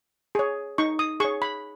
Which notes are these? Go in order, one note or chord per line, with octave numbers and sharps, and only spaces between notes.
G#4 C#5
D#4 C#6
D#6
G#4 C#5 C#6
B5